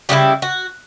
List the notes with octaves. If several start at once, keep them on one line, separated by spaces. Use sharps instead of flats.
C#3 G3 B3 E4 G4
F#4